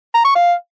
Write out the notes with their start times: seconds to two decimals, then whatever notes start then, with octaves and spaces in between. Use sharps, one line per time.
0.14 A#5
0.25 C#6
0.35 F5